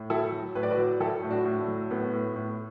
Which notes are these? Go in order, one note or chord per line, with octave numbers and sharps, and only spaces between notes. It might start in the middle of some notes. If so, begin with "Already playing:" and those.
Already playing: A2
F#3 E4 A4
F#3
A2 B4
D5
F#4 B4
F#3
F#3 E4 A4
A2
D4 F#4
A2
A3
F#3
A2 B3
A2
A2